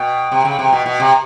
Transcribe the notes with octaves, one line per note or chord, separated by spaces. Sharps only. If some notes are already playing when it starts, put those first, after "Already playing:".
Already playing: B2 G5
C3
C#3
C3
B2 G5
B2
G5
C3 A#5